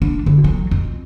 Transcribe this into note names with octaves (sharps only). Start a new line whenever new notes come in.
D4
D3
F#3
F2